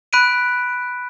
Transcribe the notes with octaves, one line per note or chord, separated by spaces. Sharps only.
B5 F#6 B6 D7 D#7